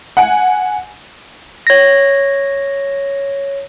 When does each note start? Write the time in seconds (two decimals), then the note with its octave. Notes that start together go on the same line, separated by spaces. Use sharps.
0.17 F#5 G#5
1.67 C#5 A#6